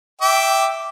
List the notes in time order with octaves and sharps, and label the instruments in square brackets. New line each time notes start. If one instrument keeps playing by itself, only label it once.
[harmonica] E5 G5 D6